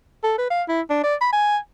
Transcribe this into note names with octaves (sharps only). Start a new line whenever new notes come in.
A4
B4
F5
E4
D4
D5
B5
G#5